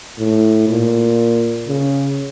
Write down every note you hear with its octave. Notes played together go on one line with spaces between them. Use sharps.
A2
A#2
C#3